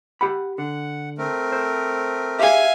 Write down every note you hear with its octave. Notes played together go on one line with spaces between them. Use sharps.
G4 F#5 B5
D3 F#5
A3 C4 A#4
C5
G4 G#4 E5 F5 G#5